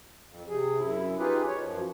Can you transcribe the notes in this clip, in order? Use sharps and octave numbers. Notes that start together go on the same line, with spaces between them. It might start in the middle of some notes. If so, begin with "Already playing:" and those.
F2
C3 G#4
F#2 E4
D#4 F4 G4 G#4 B4
C#5
F#2 F3